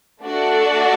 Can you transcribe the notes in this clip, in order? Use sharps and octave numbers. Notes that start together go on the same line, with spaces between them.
A3 D4 F#4 A4 D5